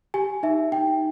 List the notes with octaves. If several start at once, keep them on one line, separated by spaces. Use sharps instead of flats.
G4 G#5
D#4 E5
D#4 G5